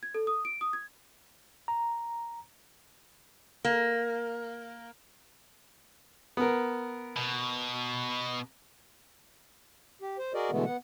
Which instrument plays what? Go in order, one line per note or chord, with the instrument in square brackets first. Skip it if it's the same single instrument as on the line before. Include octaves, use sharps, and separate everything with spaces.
[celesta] G#6
A4
D#6
D7
D#6
G#6
[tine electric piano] A#5
[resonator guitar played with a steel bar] A#3
[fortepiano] B3 A#4
[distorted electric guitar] B2
[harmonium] G4
C5
F#4 G#4 A#4 D5 D#5
B2 D3 E3 G#3 A3 B3
B3 F#5